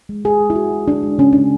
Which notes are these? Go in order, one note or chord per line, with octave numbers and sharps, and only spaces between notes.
G#3
G#3 G#4
G#3
E4
G#3 F#4
G#3
G#3 D4
G#3
C#3 C#4
G#3 D4